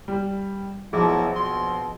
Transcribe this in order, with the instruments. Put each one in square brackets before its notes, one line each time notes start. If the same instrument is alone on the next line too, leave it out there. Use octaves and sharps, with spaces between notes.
[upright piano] G3
[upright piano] A#1 [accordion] B2 F3 F#3 [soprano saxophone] E4 [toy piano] G#4
[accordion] B2 [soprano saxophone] C6